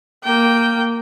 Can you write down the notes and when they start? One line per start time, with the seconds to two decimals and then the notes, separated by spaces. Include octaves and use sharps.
0.24 A#3 G5